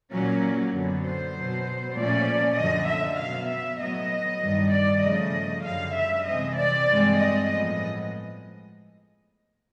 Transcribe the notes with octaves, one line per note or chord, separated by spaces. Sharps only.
A#2 F#3 A#3 C#4
F#2 D3 F#3 B3
C5
B2 F#3 B3
A#2 F3 A3 C#4 D5
F#2 D3 F3 D#5
E5
B2 F#3 B3 F5
E5
A2 F#3 B3 D#5
G2 D#3 G3
D5
C#3 F3 A3 D#5
F#2 D3 G3 F5
E5
C3 E3 G#3 C4 D#5
D5
G2 E3 G#3 C4
D#5
A2 F3 G#3 B3 D#5